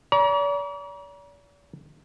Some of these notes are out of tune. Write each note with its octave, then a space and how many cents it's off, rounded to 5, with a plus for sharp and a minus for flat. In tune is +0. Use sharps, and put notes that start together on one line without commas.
D5 -45 A#5 +35